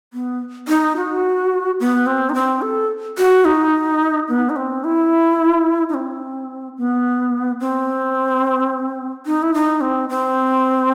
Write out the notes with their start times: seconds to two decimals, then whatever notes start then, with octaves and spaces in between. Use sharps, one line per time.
0.13 B3
0.68 D#4
0.97 F#4
1.80 B3
2.07 C4
2.30 D#4
2.35 C4
2.62 A4
3.18 F#4
3.45 D#4
4.28 B3
4.50 D#4
4.56 C4
4.84 E4
5.89 D#4
5.94 C4
6.78 B3
7.60 C4
9.26 D#4
9.43 E4
9.54 D#4
9.81 C4
10.09 C4